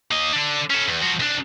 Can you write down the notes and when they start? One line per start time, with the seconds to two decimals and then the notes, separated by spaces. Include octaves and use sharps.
0.11 A#3 D#5
0.33 D3 D4
0.70 C#4 A4
0.88 E2
1.02 F3 F#4
1.20 C2 D4